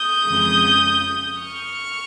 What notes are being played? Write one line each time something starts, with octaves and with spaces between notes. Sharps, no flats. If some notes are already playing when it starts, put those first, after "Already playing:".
Already playing: D#6 G6
F2 C#3 G#3
C#6 F6